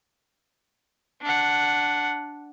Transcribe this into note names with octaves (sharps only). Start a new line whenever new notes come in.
D4 F#5